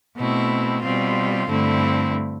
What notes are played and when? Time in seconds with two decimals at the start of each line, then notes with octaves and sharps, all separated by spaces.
0.17 B2 A3 C4 E4
0.82 B2 G3 C4 F4
1.47 G2 D3 A3 C4 E4